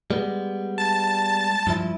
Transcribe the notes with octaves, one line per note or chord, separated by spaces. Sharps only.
G3 G#3 B3
A5 A6
G2 F3 E4